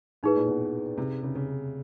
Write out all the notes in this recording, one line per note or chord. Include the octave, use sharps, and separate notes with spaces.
A2 D#4 G#4 B4
A#2
B2
C3
C#3
C#3